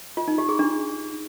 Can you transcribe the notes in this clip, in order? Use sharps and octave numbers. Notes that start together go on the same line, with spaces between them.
F4
D#4
G4
G#4
D4